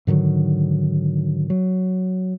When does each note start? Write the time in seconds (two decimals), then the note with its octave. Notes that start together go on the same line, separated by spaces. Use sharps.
0.07 G#2 D3 D#3 F#3
1.50 F#3